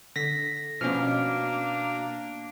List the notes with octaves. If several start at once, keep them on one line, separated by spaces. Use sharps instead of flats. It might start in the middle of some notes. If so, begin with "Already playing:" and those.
D3 A#6 B6
B2 F3 A#3 C#4 D4 F6